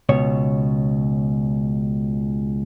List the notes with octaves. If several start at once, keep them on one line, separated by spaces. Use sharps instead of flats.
C#2 B2 C#5